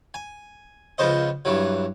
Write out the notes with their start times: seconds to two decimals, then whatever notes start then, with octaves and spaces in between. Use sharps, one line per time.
0.14 G#5
0.98 C#2 F3 B3 C5 D#5
1.45 G2 E3 F#3